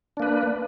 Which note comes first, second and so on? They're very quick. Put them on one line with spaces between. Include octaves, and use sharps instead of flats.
D4 A#3 B4